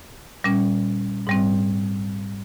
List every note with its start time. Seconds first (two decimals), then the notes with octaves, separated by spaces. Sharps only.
0.44 A#2 G3 C#4
1.27 G#2 G3 C4